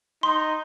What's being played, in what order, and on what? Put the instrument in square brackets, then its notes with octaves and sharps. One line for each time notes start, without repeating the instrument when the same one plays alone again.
[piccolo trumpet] D#4 [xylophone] C6